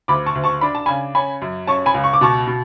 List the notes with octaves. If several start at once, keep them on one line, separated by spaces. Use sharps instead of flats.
D2 B5 D6
A5 C#6
D2
A5 C#6
D4 B5
A5
C#3 G#5 B5
C#4 G#5 B5
F#2
C#4 A5 C#6
G#5 B5
C#2
C#6
D6
B2 A5 C#6
B2